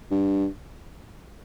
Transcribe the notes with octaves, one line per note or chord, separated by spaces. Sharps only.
G2